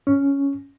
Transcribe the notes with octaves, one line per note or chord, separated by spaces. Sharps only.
C#4